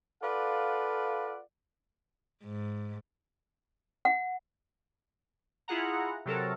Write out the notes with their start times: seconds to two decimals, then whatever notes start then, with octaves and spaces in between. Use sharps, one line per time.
0.23 F4 A4 B4 D5 F5 F#5
2.44 G#2
4.05 F#5
5.68 E4 F4 G#4 F#5 A#5
6.26 C3 F#3 A4 A#4